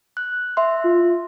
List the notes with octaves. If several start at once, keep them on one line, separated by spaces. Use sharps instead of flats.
F#6
E5 C6
F4